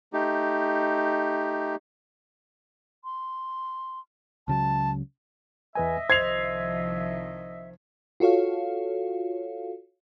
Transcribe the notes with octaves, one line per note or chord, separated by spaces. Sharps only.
A3 D#4 G4
C6
C#2 C#3 F#3 A5
E2 B4 D#5 E5 G#5
C2 D#3 F3 C5 G#6 C7 F7
F4 F#4 A4 C#5 F5